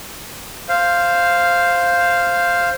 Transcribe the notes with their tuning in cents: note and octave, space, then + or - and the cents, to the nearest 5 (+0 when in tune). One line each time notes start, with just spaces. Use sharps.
C5 +0 F5 -5